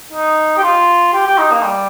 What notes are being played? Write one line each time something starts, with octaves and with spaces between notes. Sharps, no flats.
D#4
G4
F4
G4
G4
D#4
A#3
G3